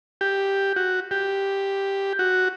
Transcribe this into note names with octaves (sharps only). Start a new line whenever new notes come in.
G4
F#4
G4
F#4